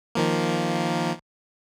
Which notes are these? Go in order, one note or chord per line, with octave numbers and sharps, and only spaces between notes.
D#3 F3 A#3